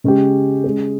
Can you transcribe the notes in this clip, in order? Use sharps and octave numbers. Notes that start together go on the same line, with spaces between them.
C#3 G#3 C#4 G4
G#3 C#4 G#4